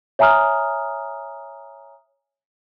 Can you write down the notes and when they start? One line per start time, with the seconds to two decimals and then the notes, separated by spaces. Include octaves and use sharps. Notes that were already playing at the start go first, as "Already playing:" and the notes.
0.19 C#5 E5 G#5 A#5 D#6 F6